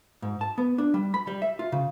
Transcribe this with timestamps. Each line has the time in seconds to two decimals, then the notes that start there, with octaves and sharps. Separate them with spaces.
0.22 G#2
0.41 A5
0.58 B3
0.78 D4
0.94 G3
1.14 B5
1.27 G3
1.42 E5
1.59 F4
1.72 C#3